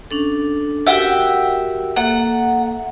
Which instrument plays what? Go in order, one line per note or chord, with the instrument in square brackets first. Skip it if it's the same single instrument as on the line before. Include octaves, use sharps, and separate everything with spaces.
[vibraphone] C#4 D4 A4
[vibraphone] F#4 G4 A#4 [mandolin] E5 F#5 G5
[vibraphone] A#3 A4 E5 [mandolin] F#5